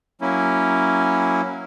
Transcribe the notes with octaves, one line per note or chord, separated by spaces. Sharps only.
F#3 A#3 C#4 E4